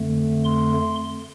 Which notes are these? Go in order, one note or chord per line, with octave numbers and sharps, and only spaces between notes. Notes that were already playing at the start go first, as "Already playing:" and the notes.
Already playing: F2 D3 A3
C6